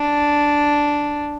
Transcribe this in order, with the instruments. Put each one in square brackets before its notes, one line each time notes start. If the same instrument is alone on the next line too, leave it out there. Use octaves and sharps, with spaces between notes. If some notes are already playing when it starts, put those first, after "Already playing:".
Already playing: [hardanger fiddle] D4